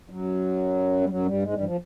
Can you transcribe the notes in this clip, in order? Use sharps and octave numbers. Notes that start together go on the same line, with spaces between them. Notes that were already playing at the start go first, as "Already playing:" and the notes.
F#2 F#3
G3
F#2 F#3
G2 G3
G#2 G#3
G2 G3
E3
F3